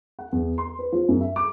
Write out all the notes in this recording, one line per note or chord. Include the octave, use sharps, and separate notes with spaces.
F#5
E2
C6
B4
F3
F#2
E5
D6